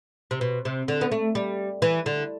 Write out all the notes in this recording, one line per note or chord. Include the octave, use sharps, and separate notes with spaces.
C3
B2
C3
D3
B3
A3
G3
E3
D3